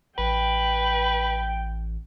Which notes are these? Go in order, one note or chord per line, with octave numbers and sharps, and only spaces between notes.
A1 B4 G5